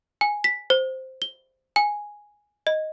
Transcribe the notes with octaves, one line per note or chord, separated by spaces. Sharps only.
G#5
B6
C5
G7
G#5
D#5